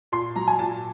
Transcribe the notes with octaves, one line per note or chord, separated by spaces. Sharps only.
A#2 C6
F#3 A#5
G#5
A#2 A5